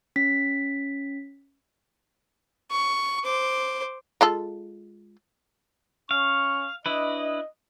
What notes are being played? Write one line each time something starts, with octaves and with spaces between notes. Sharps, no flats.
C#4 B6
C#6
C5 D6
G#3 F4 A4
C#4 F5 C#6
D4 E4 B4 D#5